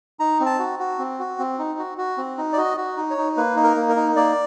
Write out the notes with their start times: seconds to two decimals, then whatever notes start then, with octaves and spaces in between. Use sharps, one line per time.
0.20 D#4 A#5
0.40 C4
0.46 A5
0.59 F#4
0.79 F#4
0.99 C4
1.19 F#4
1.39 C4
1.59 D#4
1.79 F#4
1.98 F#4
2.18 C4
2.38 D#4
2.53 D5
2.57 F#4 D#5
2.77 F#4
2.97 D#4
3.10 C#5
3.18 D#4
3.37 A#3 B4
3.56 D#4
3.64 A#4
3.77 A#3
3.89 A#4
3.96 D#4
4.16 A#3 D5